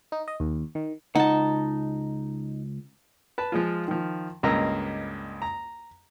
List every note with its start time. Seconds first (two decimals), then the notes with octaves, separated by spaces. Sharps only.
0.12 D#4
0.28 D#5
0.40 D#2
0.75 D#3
1.15 C#2 D#4 F#5 A5
3.38 B4 A5
3.52 F3 G#3 F4
3.88 D#3 F3
4.43 C#2 G2 A#3 D#5 A#5 E6
5.42 A#5